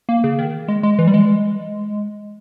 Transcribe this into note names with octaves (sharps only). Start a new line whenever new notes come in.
A#3
C#3
D#3
G#3
G#3
E3
G3
G#3